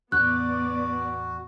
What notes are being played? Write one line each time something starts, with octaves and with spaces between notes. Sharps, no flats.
E2 A2 E3 B3 F#4 D5 F#6